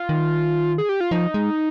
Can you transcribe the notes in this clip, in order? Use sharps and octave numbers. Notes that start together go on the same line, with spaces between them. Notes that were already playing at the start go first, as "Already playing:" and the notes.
Already playing: F4
D#3
G#4
G4
F4
F3 D#4
G#3